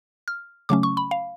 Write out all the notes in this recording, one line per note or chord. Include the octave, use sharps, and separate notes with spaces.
F6
C#3 F#3 A3 C#4 D6
C#6
B5
F5